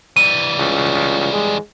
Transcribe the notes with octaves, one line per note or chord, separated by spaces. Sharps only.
E3 G3 D#7
C#2
G#3